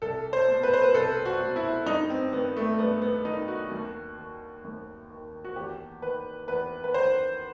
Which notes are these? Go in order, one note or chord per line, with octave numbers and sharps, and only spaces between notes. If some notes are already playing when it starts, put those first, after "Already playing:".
C2 A4
C5
B2
B4
C5
B4
C2 A4
F#4
B2
E4
G2 D#4
C4
D#3 B3
A3
G2 B3
B3
D#3 D#4
F#4
D#2
D#3
D#2
D#3
F#4
E2 G4
D#3 B4
E2 B4
B4
D#3 C5